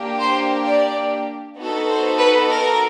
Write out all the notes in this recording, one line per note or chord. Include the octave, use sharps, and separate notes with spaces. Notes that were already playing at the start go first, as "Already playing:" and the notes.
Already playing: A#3 D4 G4
C5
D5
B3 D#4 F#4 A4
C5
B4
A#4